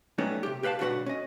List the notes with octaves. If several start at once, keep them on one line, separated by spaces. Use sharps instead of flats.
F#3 G3 A3 B3 C#4 D#4
C3 G4
G4 B4 F5 F#5 A5
B1 G#2 D3 F#4 B4 F#5
C#4 D#5